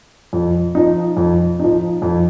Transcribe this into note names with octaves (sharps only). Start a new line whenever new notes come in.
F2
F3 D#4
F2
F3 D#4
F2